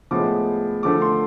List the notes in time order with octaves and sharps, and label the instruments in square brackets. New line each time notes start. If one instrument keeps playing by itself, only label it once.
[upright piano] A2 F3 G#3 B3 D6
D3 F3 A3 D6
C6